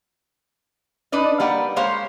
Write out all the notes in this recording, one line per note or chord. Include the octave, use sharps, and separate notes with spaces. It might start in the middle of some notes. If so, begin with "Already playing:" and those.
D4 D#4 B4 D5 D#5
G3 A#3 B4 F#5
G#3 A#3 G4 C5 C#5 F5